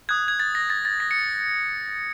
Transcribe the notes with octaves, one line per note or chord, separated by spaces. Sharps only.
D#6 F#6 G#6
G#6
A6
A#6
A6
A6
A#6
C#7